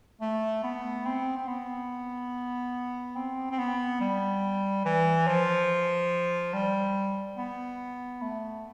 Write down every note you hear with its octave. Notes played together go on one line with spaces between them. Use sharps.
A3
B3
C4
C4
B3
C4
C4
B3
G3
E3
F3
G3
B3
A3